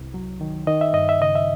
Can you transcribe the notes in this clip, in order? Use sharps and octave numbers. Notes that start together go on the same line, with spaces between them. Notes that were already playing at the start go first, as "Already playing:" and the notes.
Already playing: C2
F#3
D#3
D#3 D#5
E5
G2 D#5
E5
C#3 D#5
E5